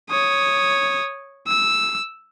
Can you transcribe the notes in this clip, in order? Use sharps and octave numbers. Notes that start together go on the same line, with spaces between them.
C#5 D#6
E6